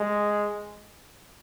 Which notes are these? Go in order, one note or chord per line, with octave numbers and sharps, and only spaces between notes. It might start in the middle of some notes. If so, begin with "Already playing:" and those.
Already playing: G#3